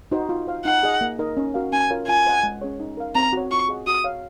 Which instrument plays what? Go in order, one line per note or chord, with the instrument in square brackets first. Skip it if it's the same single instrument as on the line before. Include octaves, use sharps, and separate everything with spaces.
[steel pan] D#4 F#4 C5
F4
C5 F5
[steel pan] D#4 [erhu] F#5
[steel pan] G#4 D#5
A#3
D#4 A#4 D#5
C#4
F#4 A#4 F5
[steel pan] C#4 [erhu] G#5
[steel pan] F4 A#4 C#5 F5
[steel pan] F4 [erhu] G#5
[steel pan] C5 D#5 F#5
G#3
C#4 G#4 C#5
D#4
A#4 F5
[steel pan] C4 [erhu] A#5
[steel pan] F#4 C#5
[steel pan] F4 [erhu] C#6
[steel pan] G#4 D#5 F#5
[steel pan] F#4 [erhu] D#6
[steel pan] C#5 F5